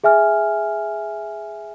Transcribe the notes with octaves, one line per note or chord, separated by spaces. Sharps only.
G#4 E5 G#5 F6